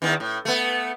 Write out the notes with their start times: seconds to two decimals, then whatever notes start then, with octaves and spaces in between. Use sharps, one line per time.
0.02 E2 D#3 E3
0.20 A2
0.45 A3 B3